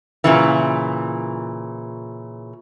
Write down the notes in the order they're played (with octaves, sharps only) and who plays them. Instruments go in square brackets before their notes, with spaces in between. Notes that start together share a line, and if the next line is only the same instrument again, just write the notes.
[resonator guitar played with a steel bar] A#2 C#3 E3